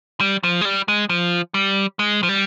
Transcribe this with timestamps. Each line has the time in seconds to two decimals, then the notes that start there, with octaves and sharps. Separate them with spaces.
0.20 G3
0.43 F3
0.61 G#3
0.65 G3
0.88 G#3
1.09 F3
1.54 G3
1.99 G#3
2.23 F3
2.29 G3